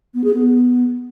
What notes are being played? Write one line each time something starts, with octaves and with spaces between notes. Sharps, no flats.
B3
G#4
B3